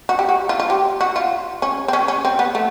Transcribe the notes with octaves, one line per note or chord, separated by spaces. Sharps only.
F#4
G4
F#4
F4
F4
G4
F#4
F4
C#4
C4
C#4
C#4
C4
B3
A3